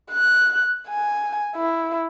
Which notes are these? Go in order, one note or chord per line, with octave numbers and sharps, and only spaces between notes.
F#6
G#5
E4